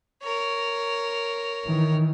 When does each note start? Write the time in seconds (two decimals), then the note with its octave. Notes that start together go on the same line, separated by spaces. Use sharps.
0.23 A#4 C#5
1.67 D#3 E3